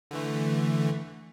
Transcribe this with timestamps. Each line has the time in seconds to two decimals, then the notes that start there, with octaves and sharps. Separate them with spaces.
0.11 D3 E3 A3